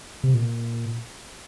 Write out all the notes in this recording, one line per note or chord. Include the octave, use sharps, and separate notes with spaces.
C3
A#2